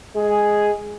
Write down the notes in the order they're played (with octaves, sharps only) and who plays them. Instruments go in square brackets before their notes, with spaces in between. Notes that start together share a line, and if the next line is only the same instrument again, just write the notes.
[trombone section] G#3 G#4